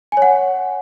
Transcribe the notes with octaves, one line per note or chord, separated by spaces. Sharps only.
C#5 F#5 G#5